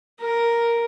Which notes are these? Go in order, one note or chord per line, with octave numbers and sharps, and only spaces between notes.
A#4